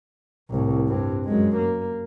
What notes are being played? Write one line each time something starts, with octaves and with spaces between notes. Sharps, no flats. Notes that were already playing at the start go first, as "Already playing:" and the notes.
C2 A2
G2 C4
F#2 G#3
A#3